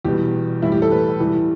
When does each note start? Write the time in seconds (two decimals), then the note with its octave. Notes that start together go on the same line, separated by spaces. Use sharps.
0.05 E2 B2 G3 G4
0.62 A2 E3 G3 E4
0.72 G4
0.82 A4
0.91 B4
1.20 E2 E3 G3